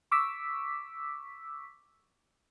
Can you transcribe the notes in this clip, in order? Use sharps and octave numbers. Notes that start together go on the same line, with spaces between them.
C#6 D6 E6 B6